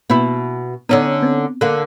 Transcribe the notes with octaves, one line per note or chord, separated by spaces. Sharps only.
B2 A#3 B3 E4
D3 B3 C#4 D#4
B3 C4
D3 A#3 F#6